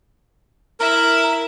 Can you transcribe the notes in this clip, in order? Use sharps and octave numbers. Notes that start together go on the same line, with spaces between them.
E4 A#4 E5